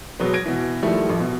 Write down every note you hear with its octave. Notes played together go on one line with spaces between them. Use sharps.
B2 F#3 G#3 B3
G#6 A#6 D7
B2 E3
D#3 F3 G3 A3 E4
A1 F3
B2